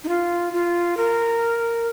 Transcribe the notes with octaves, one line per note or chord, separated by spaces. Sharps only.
D#4
F4
F4
A#4